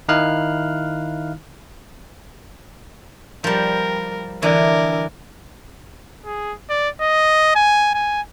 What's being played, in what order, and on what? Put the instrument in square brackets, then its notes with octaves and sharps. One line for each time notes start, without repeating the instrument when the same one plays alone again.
[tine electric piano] D#3 D#4 E4 F5 F6 F#6
[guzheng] F3 G3 [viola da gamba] A#4
[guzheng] D3 E3 [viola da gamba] A#4 D5
[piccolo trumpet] G#4
D5
D#5
G#5
G#5